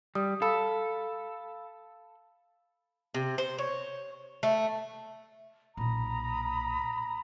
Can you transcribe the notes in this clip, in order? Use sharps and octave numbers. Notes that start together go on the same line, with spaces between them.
G3 D#6
A4 F5 B5 E6
C3
C5
C#5
A3
B1 A#2 A#5 B5 D#6